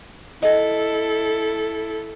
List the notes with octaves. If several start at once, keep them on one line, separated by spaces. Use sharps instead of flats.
E4 A4 D#5